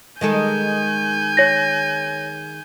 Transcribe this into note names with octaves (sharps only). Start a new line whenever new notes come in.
D#3 G#3 A4 G#5 G6
C#5 A#6